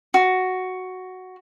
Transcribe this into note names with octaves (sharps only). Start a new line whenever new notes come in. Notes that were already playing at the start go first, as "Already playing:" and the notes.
F#4